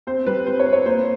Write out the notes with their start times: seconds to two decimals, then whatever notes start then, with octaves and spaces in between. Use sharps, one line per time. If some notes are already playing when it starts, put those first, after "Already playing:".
0.07 C4 C5
0.26 G3 B4
0.46 C4 C5
0.59 C#5
0.66 C4
0.73 C#5
0.86 A#3 C5